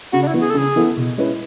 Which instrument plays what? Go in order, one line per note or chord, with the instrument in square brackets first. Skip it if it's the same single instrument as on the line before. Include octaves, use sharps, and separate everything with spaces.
[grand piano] C#3 [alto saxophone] F#4
[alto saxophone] D4
E4
[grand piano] E3 B3
[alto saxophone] G#4
A4
[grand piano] C#3 [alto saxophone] G#4
[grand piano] E3 B3 E4 A4
B2
G#3 C#4 E4 B4